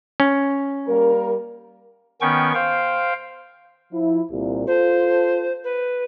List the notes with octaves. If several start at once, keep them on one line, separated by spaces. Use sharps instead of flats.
C#4
G3 A#3 A#4
D#3 B3 C#4 G5 C#6
C5 F5 G5
F3 E4
C2 A#2
F4 A4 C5
B4